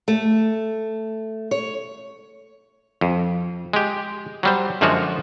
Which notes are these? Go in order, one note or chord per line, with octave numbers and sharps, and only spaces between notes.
A3
C#5
F2
G#3 G4
F#3 G3 C5
F#2 D3 F3 G#3 F4 F#4